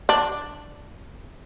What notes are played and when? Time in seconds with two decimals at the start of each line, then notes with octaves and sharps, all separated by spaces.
0.09 D4